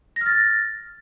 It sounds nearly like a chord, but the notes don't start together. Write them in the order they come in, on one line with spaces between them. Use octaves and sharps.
A#6 F6 A6